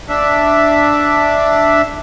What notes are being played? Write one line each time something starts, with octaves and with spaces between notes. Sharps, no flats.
D4 E5